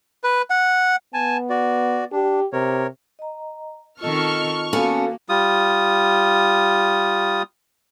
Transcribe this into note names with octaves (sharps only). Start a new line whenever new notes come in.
B4
F#5
B3 G#5 A5
F#4 D5
D4 G4
C3 A#4 C#5
D#5 A#5
D#3 C4 F4 A4 D#5 A5 C#6 F6
A#3 B3 C#4 F#4 A4 F5 G#5
G3 F4 D#6